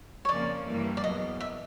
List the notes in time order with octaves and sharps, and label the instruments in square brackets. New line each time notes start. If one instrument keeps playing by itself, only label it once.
[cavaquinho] C#5
[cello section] F2 C#3 F3 A#3 C#4 [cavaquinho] D5
[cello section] G2 E3 G3 A#3
[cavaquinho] D5
[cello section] E2 B2 F#3 [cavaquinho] D#5
[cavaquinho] E5